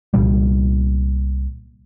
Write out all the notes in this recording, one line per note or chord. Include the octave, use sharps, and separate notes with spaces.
C2 A#2 G3